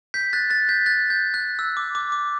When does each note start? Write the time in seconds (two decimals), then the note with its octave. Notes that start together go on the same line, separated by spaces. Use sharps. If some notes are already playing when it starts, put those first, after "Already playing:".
0.14 G6 B6
0.33 F#6 A6
0.50 F#6 A6
0.69 G6 B6
0.86 F#6 A6
1.10 G6
1.34 F#6
1.59 E6
1.77 D6
1.95 D6
2.12 D6